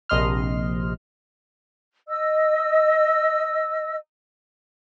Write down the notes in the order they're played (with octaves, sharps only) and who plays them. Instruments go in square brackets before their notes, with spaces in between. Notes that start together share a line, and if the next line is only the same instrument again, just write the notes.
[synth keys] A#1 C3 D#5 C6 F6
[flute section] D#5 E6